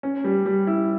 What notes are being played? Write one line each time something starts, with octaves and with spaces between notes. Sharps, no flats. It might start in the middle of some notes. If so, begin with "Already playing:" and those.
C#4
G3
G3
E4